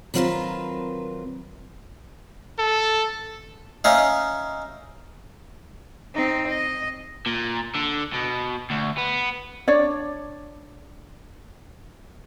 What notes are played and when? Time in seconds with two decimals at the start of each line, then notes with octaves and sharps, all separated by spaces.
0.14 D#3 F#3 C4 F4 A#4 B4
2.59 A4
3.84 C#4 D#4 E5 F5
6.14 C4 D#4
6.48 D#5
7.26 A#2
7.75 D3
8.14 B2
8.70 D2
8.98 B3
9.68 D4 C#5 D5